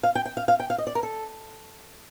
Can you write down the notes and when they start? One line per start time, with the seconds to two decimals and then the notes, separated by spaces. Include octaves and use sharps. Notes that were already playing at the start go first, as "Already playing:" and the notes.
0.03 F5
0.15 G5
0.25 G5
0.37 F5
0.48 F5
0.60 G5
0.70 F5
0.78 D#5
0.87 D5
0.95 A#4
1.03 A4